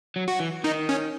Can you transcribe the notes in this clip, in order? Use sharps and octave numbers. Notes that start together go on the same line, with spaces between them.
F#3
F#4
E3
D#3 D#4
C#4